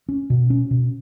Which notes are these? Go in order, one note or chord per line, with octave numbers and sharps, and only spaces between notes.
C#4
B2
C#4
B2